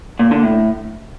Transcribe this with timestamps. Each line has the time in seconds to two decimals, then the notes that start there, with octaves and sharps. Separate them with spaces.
0.19 A#2
0.31 D3
0.43 A2